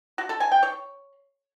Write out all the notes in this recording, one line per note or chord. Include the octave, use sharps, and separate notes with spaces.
F#4
A4
G#5
G5
C#5